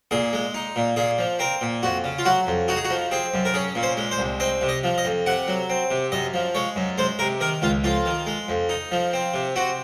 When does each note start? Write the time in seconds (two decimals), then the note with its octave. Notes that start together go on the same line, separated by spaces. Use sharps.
0.11 A#2 G#4
0.33 G#3
0.54 D#4
0.76 A#2
0.96 A#2 G#4
1.18 F3
1.39 C4 A#4
1.61 A#2
1.83 F2 F#4
2.04 C#3
2.19 F4
2.25 F#3 F#4
2.47 F2
2.68 D#4 F#4
2.76 G#4
2.85 F#4
2.90 F3
3.11 C4 G#4
3.34 F#2
3.45 A#4
3.54 C#4 G#4
3.75 A#2
3.83 C5
3.97 G#3
4.11 C5
4.19 C2
4.40 C4 D#5
4.62 C3
4.69 D#5
4.84 F3
4.98 D#5
5.05 F2
5.26 C3 F#5
5.48 F#3
5.70 C4
5.91 C3
6.12 F#2 D#5
6.34 F3
6.55 G#3 C#5
6.76 F#2
6.98 G#3 C5
7.19 C3 A#4
7.40 D#3 A#4
7.62 C#2 F4
7.84 F2 F4
8.06 D#3
8.27 G#3
8.49 F2
8.69 D#4
8.92 F3
9.13 C4
9.34 C3
9.56 C4 F#4